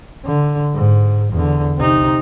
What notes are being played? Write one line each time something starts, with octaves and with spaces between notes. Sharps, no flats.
D3
G#2
E2 D3
C3 D#4